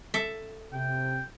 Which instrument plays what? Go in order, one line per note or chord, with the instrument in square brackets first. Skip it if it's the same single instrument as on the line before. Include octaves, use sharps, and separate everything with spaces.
[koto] A4 E5
[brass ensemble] C3 [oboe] G5